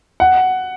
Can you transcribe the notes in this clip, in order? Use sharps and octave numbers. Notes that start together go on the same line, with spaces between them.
F#5